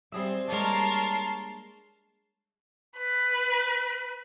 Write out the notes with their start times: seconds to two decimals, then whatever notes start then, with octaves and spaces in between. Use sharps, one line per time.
0.12 G3 C4 G#4 C5 E5
0.48 G3 G#3 A#3 D4 A#4 C#5 A5 C6
2.98 B4